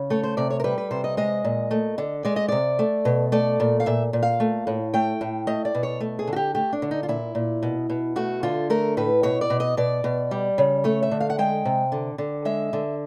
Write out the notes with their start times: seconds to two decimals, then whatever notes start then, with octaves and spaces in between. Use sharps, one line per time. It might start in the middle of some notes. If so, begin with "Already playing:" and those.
Already playing: C#3
0.10 A3 C#5
0.23 C5
0.37 C3 D5
0.50 C#5
0.60 A#4
0.64 G3 B4
0.78 B4
0.91 C3 C5
1.04 D#5
1.17 G#3 D#5
1.45 A#2
1.71 A3
1.98 D3
2.25 G#3 D5
2.36 D#5
2.48 C3 D5
2.79 A3
3.05 B2
3.32 A3 D5
3.60 A#2
3.80 F5
3.86 A#2 E5
4.13 A#2
4.23 F5
4.40 A3
4.67 A2
4.94 A3 G5
5.21 A2
5.47 A3 D#5
5.65 D5
5.75 B2
5.83 C#5
6.00 A3
6.19 G#4
6.27 D3
6.33 F#4
6.36 G4
6.55 A3 G4
6.73 D4
6.82 D3
6.91 D#4
7.03 F4
7.09 A#2 E4
7.35 A#2
7.63 B2
7.90 B2
8.16 A3 F#4
8.43 D3 F4
8.70 A3 A#4
8.97 A2 B4
9.23 B2 C#5
9.41 D5
9.50 B2
9.60 D#5
9.77 B2 D5
10.04 B2
10.31 G3
10.58 C#3
10.84 A3 C#5
11.03 E5
11.11 D3
11.20 F5
11.30 F#5
11.38 G#3 G5
11.65 C3
11.92 D3
12.18 D3
12.45 G#3 E5
12.73 D3